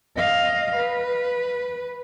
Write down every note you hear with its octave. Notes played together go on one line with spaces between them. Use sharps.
D#5 F5
B4